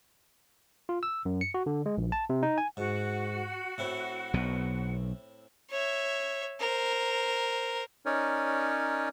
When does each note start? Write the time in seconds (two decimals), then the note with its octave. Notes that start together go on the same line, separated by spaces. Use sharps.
0.89 F4
1.03 E6
1.25 F#2
1.41 C#7
1.54 F#4
1.66 D3
1.86 G#3
1.98 A#1
2.12 A5
2.30 C3
2.43 D#4
2.58 G#5
2.77 G#2 F#4 F#5
3.78 A2 C4 E4
4.34 B1 B2
5.70 C#5 E5
6.60 A#4 C5
8.06 C#4 D#4 A#4 C#5 D5